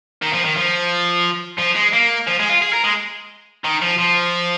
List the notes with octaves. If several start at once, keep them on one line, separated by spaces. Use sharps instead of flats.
D#3
F3
D#3
F3
F3
G#3
A#3
F3
G#3
F4
G#4
A#4
G#3
D#3
F3
F3